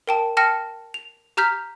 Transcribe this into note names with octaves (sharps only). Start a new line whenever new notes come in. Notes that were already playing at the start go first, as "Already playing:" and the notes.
A#4 G5 A5
G5 A5 F6 A#6 C#7
F7
G4 A#5 F6 G6 B6